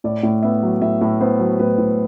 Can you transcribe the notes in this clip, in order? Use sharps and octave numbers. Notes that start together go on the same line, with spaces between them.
A2 D5
A2
B3 E5
F#3
A2 E5
A2
B3 C5
F#3
A2 B4
A2